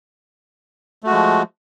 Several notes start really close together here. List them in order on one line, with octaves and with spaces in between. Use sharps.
A3 F#4 G#3 F3